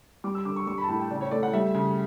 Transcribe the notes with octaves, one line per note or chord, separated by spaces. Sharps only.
G3 D6
E6
D3 D6
C#6
G3 C#6
B5
A5
A2 B5
G5
C#3 D5
C#5
A3 D5
F#5
G3 E5
C#3